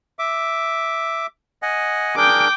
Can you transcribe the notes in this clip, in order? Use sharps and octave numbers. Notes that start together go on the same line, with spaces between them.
E5 D6
D#5 F#5 G#5
D4 G#4 A#4 G5 D6